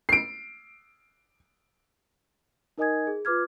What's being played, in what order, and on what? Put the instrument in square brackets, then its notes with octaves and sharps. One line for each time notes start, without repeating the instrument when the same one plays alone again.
[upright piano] C7 D7
[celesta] D#4 A#4 D#5 G#5 D#6 G#6
G#4
F4 B4 D6 F6 G#6